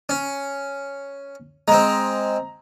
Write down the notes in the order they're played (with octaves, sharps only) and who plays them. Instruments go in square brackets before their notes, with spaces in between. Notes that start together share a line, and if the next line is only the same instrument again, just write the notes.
[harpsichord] C#4
[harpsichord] G#3 C4 [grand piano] A#5